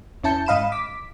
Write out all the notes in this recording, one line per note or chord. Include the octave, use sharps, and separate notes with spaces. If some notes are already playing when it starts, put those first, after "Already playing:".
E2 C#4 E4 A5 G6 C#7
G#2 D#5 F5 B5 D#7 E7
D6 B6